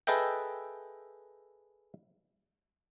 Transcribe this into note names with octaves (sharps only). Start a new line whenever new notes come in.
G#4 A4 B4 D#5 E5 G5